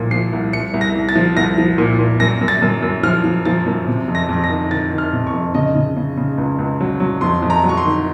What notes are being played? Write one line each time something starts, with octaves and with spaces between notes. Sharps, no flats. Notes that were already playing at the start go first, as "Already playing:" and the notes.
Already playing: C2 A#2 F3
F3 C7
C2
C2 C#7
C2
A#6
C2
A6
F3
C2 A#6
F3
A#2
A#2
F#2 A#6
F#2
A6
F#2
F#2
F3 F6
F3
F3 A6
F#2
C3
F2
A#6
F2
A#6
D#3
D#3 A6
D#3
F6
C3
C#6
F2
C#3 D#5
C#3
C#3
C#3
C#2
C#2
F#3
F#3
F2 C6
F2
A#5
F#3
C#6
C6
D#3